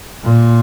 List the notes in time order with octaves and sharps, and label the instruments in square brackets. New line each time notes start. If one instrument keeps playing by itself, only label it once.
[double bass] A#2